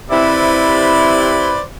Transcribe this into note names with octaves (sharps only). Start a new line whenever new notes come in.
C3 E4 B4 C5 D5